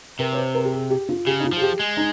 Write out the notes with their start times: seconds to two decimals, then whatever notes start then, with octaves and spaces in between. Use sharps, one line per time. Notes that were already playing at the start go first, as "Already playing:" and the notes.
0.19 C3 A#4
0.33 C#5
0.37 C5
0.55 A#4
0.65 G4
0.73 G#4
0.90 G4
1.09 F4
1.27 C#3 G4
1.40 D#4
1.45 F4
1.53 F3 G#4
1.62 G4
1.80 G#3
1.97 D#4